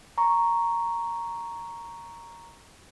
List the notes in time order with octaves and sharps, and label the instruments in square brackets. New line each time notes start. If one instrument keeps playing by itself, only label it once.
[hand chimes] A#5 C#6